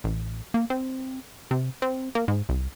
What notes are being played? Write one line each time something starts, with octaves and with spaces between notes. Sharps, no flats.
A1
A#3
C4
C3
C4
A#3
G#2
C2